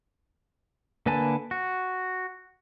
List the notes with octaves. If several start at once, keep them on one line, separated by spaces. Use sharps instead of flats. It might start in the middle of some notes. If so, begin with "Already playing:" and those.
D3 A#3 B4 G#5 A5
F#4